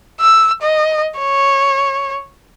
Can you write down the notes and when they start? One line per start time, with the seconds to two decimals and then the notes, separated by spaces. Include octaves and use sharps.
0.21 E6
0.62 D#5
1.19 C#5